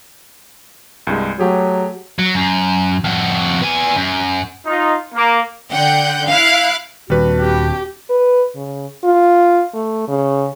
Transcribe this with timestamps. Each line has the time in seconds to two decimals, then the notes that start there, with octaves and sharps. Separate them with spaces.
1.07 C2 G2 G#3
1.39 F#3 A3 G4 G#4
2.18 F#3
2.35 F#2
3.04 F2 F#4
3.62 B3 G#5
3.96 F#2
4.67 D#4 F4
5.14 A#3
5.72 D3 F#5 G5 F#6 G6
6.29 E4 F5 F6 F#6 C7
7.10 D#1 D#2 G3 C4 D4 F#4 B4
7.41 G4
8.10 B4
8.55 C#3
9.04 F4
9.74 A3
10.08 C#3